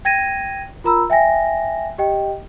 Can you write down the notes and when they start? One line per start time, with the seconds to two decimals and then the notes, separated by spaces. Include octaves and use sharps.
0.05 G5 G#6 A#6 D#7
0.84 F4 A#4 A#5 B5 E6
1.10 E5 G5 G#5 A#6
1.98 G4 D#5 G5